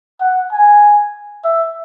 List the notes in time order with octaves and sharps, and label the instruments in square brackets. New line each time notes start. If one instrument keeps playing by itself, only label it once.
[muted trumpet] F#5
G#5
E5